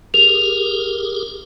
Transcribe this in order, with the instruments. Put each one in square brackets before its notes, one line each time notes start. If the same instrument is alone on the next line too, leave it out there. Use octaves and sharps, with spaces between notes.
[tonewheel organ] G4 G#4 A#4 [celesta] F7